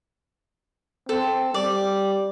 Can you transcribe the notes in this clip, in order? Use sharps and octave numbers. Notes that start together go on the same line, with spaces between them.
C4 A4
G3 D5